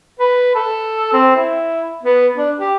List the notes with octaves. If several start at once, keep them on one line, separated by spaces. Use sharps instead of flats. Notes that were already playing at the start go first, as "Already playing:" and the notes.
B4
A4
C4
E4
B3
D4
G4